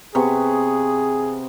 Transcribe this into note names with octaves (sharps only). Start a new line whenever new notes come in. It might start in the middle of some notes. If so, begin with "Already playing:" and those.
C3 B3 G#4 C#6